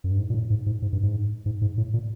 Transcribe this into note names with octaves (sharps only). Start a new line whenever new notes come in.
F#2
G2
G#2
A#2
A2
G#2
G#2
G#2
G2
G#2
G#2
G#2
A2
A#2